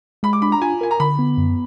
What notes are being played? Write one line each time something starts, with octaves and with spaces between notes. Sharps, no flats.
G#3 B5
D6
D4 B5
A#5
F4 G#5
A#4 G#5
A#5
D3 B5
B3
F#2